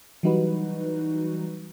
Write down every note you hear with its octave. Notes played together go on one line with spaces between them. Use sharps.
E3 F#3 G3 D#4 F#4 B4